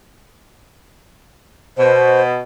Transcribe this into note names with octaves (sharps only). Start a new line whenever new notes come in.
B2 C5